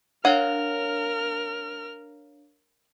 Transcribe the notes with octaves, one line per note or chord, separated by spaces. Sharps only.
D4 A#4 C#5 F5 F#5 F6